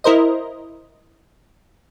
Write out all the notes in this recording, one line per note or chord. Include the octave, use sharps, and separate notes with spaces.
E4 A#4 C5 D#5